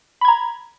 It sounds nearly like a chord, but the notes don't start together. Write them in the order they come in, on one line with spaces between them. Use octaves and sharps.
B5 G#6 A#5